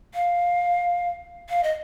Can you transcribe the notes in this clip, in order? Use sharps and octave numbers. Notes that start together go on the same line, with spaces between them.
F5
F5
D#5